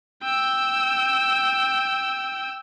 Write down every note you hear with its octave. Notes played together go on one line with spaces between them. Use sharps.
G5 E6